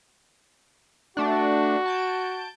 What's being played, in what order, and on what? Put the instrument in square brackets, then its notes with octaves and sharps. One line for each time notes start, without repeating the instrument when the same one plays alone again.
[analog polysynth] A3 D4 [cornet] F#4
[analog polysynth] A5 G6 D7